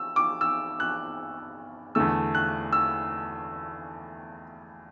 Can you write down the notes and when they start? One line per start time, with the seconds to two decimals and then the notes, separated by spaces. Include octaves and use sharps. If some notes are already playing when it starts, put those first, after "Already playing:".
Already playing: E6
0.16 D6
0.41 E6
0.80 F#6
1.95 E2 D3 A3 E6
2.35 F#6
2.73 E6